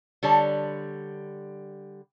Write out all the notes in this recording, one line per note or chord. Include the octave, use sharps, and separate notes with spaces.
D3 G3 C#5 A5